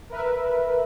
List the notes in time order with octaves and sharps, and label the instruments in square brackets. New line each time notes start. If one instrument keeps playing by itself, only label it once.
[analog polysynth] A#4 B4 E5